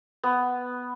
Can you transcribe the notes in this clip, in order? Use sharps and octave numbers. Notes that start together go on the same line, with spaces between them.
B3